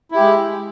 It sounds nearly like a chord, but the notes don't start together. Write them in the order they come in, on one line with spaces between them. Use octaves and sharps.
E4 G4 G#3